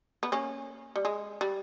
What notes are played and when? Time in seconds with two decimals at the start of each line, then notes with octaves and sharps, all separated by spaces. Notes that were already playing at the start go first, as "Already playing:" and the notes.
0.23 B3
0.32 A#3 C#4
0.96 G3
1.05 G#3
1.41 G3